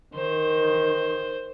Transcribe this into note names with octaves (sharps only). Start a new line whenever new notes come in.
D#3 C5